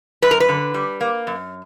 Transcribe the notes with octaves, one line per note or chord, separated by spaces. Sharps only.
F#2 B4
A#4
B4
D3
G3
A#3
F#2